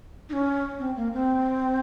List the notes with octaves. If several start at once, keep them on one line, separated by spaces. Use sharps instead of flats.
D#4
C#4
C4
A#3
C4